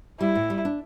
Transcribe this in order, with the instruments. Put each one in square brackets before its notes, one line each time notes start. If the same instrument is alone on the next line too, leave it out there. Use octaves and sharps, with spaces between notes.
[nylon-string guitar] G3 [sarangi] E4
[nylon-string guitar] A2
G3
D4